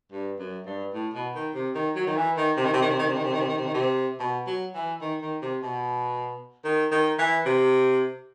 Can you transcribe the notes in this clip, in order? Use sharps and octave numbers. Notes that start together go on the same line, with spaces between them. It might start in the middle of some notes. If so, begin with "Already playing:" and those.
G2
F#2
G2
A2
B2
D#3
C3
D#3
F#3
D#3
E3
D#3
C3
D#3
C3
D#3
C3
D#3
C3
D#3
C3
D#3
C3
D#3
C3
D#3
C3
B2
F#3
E3
D#3
D#3
C3
B2
D#3
D#3
E3
C3